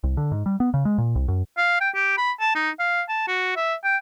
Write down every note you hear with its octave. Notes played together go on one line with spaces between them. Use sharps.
C2
D3
G#2
G3
B3
C#3
G#3
A#2
C2
F#2
F5
G5
G4
B5
A5
D#4
F5
A5
F#4
E5
G5